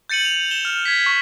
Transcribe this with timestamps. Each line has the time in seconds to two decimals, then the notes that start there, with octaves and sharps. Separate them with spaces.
0.09 G6 A6 C#7 D#7 F#7
0.25 F7
0.51 E7 G7
0.65 F6
0.85 G#6 B6
1.06 C#6